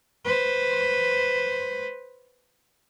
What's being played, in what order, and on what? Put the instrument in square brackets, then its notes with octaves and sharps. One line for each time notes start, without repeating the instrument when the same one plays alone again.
[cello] B4 C5